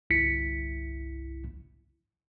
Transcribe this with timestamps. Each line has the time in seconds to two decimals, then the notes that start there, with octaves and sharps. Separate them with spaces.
0.10 G1 C2 E4 B6 C#7